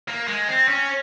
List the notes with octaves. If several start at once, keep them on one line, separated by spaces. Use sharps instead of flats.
A#3
G#3
C4
C#4